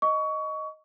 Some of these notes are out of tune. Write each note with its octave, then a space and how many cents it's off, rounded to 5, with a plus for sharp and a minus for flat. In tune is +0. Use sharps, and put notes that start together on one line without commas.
D#5 +0 C#6 +25